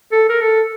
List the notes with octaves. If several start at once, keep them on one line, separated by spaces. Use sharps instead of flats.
A4
A#4
A4